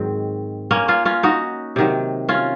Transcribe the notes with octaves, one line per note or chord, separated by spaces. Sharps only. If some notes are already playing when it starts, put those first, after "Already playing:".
Already playing: G#2 D#3 F#3 C4
A#3 C#4
C#4 F4
C#4 F4
D#4 F#4
C3 D#3 F#3
C#4 F4